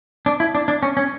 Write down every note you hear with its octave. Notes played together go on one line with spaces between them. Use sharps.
D4
E4
D4
D4
C#4
C#4